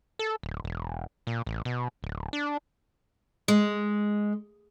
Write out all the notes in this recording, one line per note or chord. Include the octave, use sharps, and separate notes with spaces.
A4
D1
E1
A#2
A1
B2
D1
D4
G#3